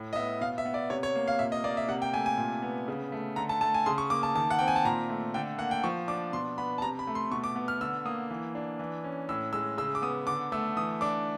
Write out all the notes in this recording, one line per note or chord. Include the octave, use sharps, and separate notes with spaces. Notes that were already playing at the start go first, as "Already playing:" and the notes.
Already playing: A2
D#5
B3 E5
B2 F5
E5
B3
D5
C3 C#5
C#5
A#3
F5
A#2 E5
D#5
A#3 D5
E5
C3 F#5
G5
A3 G#5
G#5
A#2
B3
C#3
A3
D3 A#5
A5
A3 A5
G#5
C#3 C6
C#6
A#3 D6
A5
D#3 A5
F#5
C4 G5
G#5
A5
A#2 A#5
A3
D3 G5
A#3 F#5
G5
F3 C#6
D4 D6
B2 C6
B3 B5
A5
C3 A#5
B5
A3
C6
B2 C#6
D6
B3
F6
D3 E6
A#3 D#6
E3
D4
E3
C#4
A2 E6
G#3 E6
C#3 E6
D6
B3 D#6
D3 D6
A3 E6
E3 D#6
D4 D6